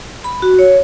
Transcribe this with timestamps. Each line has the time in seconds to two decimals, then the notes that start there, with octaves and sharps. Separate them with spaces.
0.24 B5
0.42 F#4
0.59 C#5